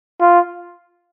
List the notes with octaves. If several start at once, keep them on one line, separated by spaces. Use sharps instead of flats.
F4